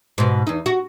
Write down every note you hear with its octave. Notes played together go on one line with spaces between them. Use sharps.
G#2 B2
E2 D#4
F#4